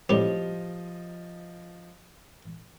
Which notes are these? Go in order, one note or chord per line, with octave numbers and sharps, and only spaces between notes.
A2 F3 G3 C4 G4 D#5 G7